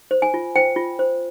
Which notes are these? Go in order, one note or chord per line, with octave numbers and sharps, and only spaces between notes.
C5
G#5
F4
C5 G5
F4
C5